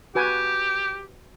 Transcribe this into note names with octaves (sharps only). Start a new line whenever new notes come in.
F#4 G4 B4 G#5